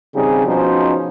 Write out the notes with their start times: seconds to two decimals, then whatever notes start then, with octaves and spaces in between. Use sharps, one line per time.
0.15 C#3 G3 C4 D#4 G4 G#4
0.46 B2 F3 C#4 D#4 C5